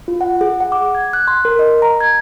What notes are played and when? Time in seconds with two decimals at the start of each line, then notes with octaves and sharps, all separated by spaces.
0.08 F4
0.21 F#5
0.41 G#4
0.61 F#5
0.72 D6
0.95 G#6
1.13 F#6
1.28 C6
1.45 A#4
1.59 D#5
1.82 A#5
2.01 G#6